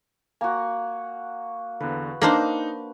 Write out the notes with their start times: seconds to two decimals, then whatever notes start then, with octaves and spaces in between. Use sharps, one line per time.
0.41 A#3 F#4 G#5
1.80 E2 D3 B4
2.22 A#3 D4 D#4 C5 F5